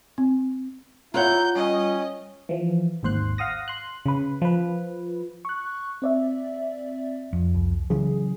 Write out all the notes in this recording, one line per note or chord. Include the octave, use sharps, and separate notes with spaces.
C4
E4 F4 C#5 F#5 A#5 G6
G3 C#4 D#5
E3 F3
G#1 D#2 C5 C6 F#6
F5 F#5 D#6 A#6
C6 F#6
C#3 B4
F3 B4
C#6 F#6
C4 D5 E5
F2
C2
C#3 E3 F#3 G#4